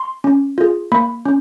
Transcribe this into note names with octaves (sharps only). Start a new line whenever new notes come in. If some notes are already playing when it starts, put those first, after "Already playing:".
Already playing: C6
C#4
F4 G#4
A#3 B5
C#4